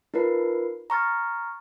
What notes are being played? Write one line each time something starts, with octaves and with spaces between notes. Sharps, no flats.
D#4 F4 A#4 B4 C7
A#5 C#6 F6 A6